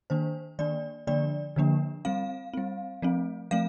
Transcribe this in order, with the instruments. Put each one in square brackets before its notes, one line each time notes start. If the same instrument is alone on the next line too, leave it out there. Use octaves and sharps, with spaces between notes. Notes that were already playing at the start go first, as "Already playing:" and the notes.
[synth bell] D#3 A#3 D4 C5
D#3 A#3 D4 D5
D3 F3 A#3 D4 D5
D3 F3 A#3 D4
G3 C4 F5
G3 C4
F3 A3 C4
F3 A3 C4 F5